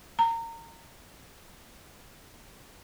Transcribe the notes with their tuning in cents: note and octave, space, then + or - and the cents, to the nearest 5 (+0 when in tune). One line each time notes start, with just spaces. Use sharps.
A#5 -25